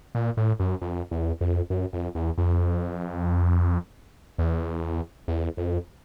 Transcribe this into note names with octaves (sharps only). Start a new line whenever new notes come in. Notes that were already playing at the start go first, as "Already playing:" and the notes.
A#2
A2
F#2
F2
E2
F2
F#2
F2
E2
F2
E2
E2
F2